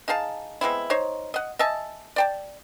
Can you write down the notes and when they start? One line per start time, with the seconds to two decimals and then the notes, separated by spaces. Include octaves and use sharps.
0.08 D#4 G#4 F5 A5
0.61 G#3 B3 C4 E4
0.90 D#4 C5 C#5
1.34 D#5 F#5
1.59 D#5 E5 G#5 A5
2.16 D5 G5 A5